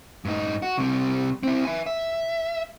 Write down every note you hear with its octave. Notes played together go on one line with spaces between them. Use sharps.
G2 D#4
F#4
C3 G3
C4 E4
E5 G#5
E5